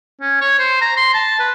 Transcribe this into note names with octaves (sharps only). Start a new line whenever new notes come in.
C#4
C#5
C5
A#5
C6
A5
B4